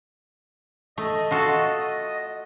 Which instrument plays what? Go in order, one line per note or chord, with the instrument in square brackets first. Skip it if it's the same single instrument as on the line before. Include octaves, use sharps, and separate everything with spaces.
[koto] A3 [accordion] D#5
[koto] F4 F#4 A4